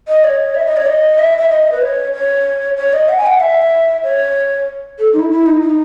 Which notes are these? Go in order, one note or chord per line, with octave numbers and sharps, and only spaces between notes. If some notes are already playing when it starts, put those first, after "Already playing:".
D#5
C#5
E5
D#5
C#5
D#5
E5
E5
D#5
B4
C#5
C#5
C#5
D#5
F#5
G#5
F#5
E5
C#5
A4
D#4
E4
E4
D#4
D#4